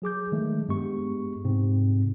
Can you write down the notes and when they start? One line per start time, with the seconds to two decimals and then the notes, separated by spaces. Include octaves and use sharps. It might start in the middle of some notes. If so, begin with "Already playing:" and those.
0.02 F#3 G#4 D6 G6
0.32 D#3 F#3 G#3 A3
0.68 G2 G#3 B3 G4 C#6
1.44 G#2 C3 C4